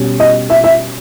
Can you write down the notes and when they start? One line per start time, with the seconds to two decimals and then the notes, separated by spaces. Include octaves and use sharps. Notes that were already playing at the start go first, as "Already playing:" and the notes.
Already playing: B2 G3 C#4
0.20 D#5
0.50 E5
0.64 E5